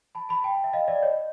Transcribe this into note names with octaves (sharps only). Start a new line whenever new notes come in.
A5 B5
A5 B5
G5 A5
E5
D#5 F5
D5 E5
C#5 D#5